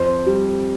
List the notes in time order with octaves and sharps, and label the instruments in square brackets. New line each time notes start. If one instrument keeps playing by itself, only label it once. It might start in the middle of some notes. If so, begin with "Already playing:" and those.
Already playing: [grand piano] F2 [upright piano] C5
[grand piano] G3